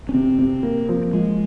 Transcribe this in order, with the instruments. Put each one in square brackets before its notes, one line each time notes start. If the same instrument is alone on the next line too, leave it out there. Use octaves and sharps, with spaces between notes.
[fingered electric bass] C#4
[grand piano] C3 [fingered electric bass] C4
[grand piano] C3
A#3
F3
[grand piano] F3 [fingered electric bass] G#3